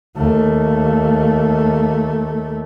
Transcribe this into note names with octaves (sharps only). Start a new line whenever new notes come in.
D#2 A3